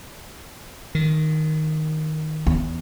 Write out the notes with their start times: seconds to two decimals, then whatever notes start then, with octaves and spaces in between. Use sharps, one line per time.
0.95 D#3
2.47 E2